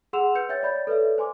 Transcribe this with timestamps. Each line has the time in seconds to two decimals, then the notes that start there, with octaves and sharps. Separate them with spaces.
0.13 G#4 F#5 C6 E6 E7 F7
0.35 B4 G6 C#7
0.49 C#5 E5 G5 G6 A6
0.62 C#5 D5 B5 G6 A6
0.87 A4 B4 C#5 D5 E5
1.18 C5 G#5 C6 D6